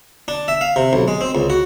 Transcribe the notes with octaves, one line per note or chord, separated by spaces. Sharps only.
D4
E5
F5
C3
B1
G#3
C4
C#2
F#4